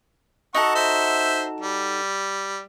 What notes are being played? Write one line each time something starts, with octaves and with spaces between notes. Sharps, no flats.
D#4 F#4 A4 F#5 C#6
C5 E5
G3